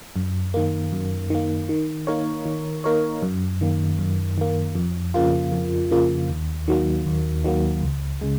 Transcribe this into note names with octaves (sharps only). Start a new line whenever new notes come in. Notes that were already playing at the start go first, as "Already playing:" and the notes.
F#2
D#3 A#3
F#2
D#3 A#3
D#3
A#3 D#4 A#4 C#5
D#3
A#3 D#4 A#4 C#5
F#2
D#3 A#3
F#2
D#3 A#3
F2
C#3 F3 A#3 F4
F2
C#3 F3 A#3 F4
D#2
D#3 F#3 A#3
D#2
D#3 F#3 A#3
C#2
C#3 G#3